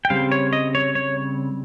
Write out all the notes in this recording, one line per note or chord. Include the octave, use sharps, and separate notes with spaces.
G5
C#3 G3 C4 F5
C#5
D#5
C#5
C#5